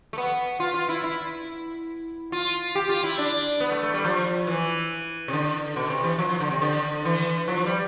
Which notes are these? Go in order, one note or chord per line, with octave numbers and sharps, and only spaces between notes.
A3
B3
F4
F4
E4
E4
F4
G4
F4
E4
D4
B3
A3
A3
G3
F3
E3
C3
D3
B2
C3
E3
F3
F3
D3
C3
D3
E3
F3
G3